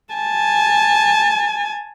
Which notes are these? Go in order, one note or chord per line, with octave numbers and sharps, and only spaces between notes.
G#5 A5